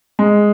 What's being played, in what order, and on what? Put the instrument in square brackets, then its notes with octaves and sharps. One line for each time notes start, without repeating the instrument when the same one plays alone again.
[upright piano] G#3